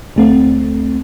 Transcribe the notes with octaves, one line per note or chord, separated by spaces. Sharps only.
D2 A3 C4